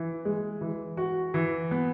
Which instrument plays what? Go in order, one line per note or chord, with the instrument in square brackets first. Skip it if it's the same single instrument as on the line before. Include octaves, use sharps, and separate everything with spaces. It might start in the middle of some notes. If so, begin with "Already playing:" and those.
Already playing: [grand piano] E3
G#3
E3
F#4
E3
B3